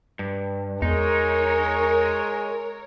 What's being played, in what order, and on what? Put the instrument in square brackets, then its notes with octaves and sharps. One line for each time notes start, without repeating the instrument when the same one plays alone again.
[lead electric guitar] G2
[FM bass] E2 [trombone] G#3 [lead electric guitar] D#4 [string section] A#4 C#5